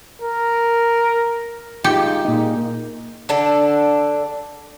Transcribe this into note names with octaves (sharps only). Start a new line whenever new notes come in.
A#4
G#3 D#4 F4 G4
A#2 D#4 G#4 A#4 D#5
D3 D4 A4